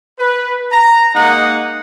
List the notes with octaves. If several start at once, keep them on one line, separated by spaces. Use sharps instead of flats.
B4
A#5
G#3 A#3 D#4 D#5 F#5